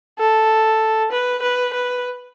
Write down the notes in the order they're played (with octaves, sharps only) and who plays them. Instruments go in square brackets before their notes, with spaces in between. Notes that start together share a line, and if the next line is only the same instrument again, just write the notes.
[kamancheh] A4
B4
B4
B4